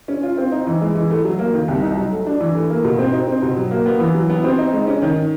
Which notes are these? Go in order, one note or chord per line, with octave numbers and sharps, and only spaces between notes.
C#4
F4
C4
D#4
E3
G#3
E3
A3
F#3
A#3
D#3
C2
D#4
F#3
A3
D4
E3
A3
A#3
B2
C4
D#4
C4
B2
F#3
A#3
B3
E3
F#3
B3
C4
D#4
G#3
C#4
D#3